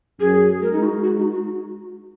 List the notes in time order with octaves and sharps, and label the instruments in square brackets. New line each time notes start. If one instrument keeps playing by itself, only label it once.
[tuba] F#2 [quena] G#4
[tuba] G#3 [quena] A#4
[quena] D#4
F#4
F#4
D#4
F#4